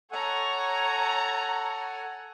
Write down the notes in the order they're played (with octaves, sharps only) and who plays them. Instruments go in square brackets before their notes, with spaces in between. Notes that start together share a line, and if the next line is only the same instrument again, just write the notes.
[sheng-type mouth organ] A4 F#5 G#5 [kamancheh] C#5 A#5